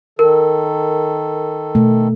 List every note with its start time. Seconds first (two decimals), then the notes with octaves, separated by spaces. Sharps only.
0.19 D#3 A4 A#4
1.75 B2 A3